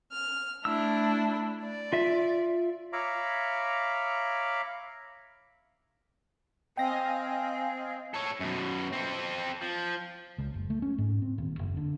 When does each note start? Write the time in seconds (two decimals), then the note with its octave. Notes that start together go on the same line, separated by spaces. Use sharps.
0.11 F6
0.65 A3 D4 E4 E6
1.61 D5
1.93 F4 E5
2.93 C#5 E5 F5 A#5 B5 D6
6.77 C4 D#5 F5 G5 G#5 A#6
8.14 A4 C#5
8.40 F#2 B2
8.93 C4 A4
9.61 F3
10.38 C#2
10.54 F#1
10.70 A3
10.82 C#4
10.98 G#2
11.22 C4
11.38 D#1
11.59 F#1
11.77 D3